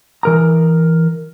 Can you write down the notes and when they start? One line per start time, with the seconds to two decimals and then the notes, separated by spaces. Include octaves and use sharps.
0.23 E3 A#4 A#5